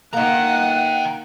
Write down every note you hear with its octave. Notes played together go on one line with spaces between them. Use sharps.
A#3 D#4 F#5 G5 A#5